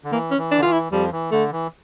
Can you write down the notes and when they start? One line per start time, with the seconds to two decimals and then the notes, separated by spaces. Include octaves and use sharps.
0.04 D3
0.11 E3 A#3
0.31 C#4
0.38 E3
0.51 D4
0.59 D3
0.63 E3 F4
0.72 E4
0.92 F2 F3 G3
1.12 E3
1.31 D3 A3
1.52 E3